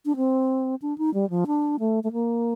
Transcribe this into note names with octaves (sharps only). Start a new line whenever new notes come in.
D4
C4
D4
D#4
G3
F3
D4
A3
A3
A#3